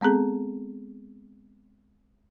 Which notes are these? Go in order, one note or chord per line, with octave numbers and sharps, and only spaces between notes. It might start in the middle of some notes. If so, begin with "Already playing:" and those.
G#3 B3 C4 G#4 A4